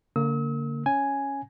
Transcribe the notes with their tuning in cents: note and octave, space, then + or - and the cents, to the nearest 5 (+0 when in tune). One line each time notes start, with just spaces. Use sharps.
D3 -45 A#3 -25 E6 -45
C#4 +0 G#5 +0